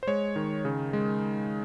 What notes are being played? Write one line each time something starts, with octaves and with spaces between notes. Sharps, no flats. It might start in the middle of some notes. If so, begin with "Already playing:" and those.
C5
G#3 C#5
D#3
C#3
G#3